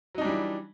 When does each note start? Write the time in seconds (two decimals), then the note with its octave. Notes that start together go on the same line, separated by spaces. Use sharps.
0.15 F#3
0.18 D#4
0.21 D4
0.25 G3
0.28 E3